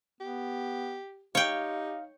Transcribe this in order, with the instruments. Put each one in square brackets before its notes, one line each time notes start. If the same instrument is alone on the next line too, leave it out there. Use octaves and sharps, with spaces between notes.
[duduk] B3 [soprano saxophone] G4
[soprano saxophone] D#4 [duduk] G4 [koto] C#5 G5 [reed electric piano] F5